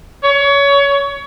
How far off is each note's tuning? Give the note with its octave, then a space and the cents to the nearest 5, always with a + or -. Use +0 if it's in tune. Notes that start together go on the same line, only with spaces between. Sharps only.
C#5 +25